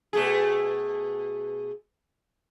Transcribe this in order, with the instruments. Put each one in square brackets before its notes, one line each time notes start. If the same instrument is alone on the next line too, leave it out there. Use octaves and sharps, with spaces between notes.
[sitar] B2 A3 G#4